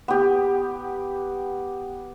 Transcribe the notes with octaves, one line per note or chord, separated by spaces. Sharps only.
B3 G4